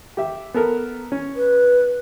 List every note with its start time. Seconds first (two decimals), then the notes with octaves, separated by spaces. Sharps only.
0.17 G4 E5
0.54 B3 A4 A#4
1.12 C#4
1.36 B4